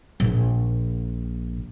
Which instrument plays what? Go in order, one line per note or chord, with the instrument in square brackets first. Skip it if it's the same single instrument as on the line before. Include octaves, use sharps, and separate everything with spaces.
[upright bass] A#1 A#2